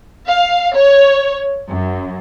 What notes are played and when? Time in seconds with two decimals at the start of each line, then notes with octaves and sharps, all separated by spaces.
0.28 F5
0.75 C#5
1.70 F#2